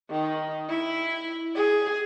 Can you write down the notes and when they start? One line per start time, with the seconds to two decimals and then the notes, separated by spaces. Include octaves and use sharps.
0.10 D#3
0.69 E4
1.55 G#4